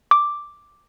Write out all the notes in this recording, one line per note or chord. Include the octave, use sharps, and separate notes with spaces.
D6